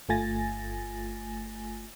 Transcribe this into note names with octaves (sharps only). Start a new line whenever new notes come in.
G1 A3 F4 G#5 A6 A#6